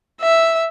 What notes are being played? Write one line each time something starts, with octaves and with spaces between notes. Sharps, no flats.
E5